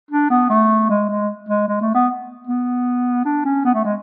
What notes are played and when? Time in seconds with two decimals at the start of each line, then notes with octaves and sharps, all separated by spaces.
0.11 D4
0.30 B3
0.50 A3
0.89 G#3
1.09 G#3
1.49 G#3
1.68 G#3
1.81 A3
1.94 B3
2.47 B3
3.25 D4
3.45 C#4
3.65 B3
3.74 A3
3.84 G#3